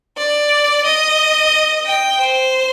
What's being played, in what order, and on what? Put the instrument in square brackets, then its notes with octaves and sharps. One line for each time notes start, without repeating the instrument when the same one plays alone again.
[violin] D5
D#5
G5
C5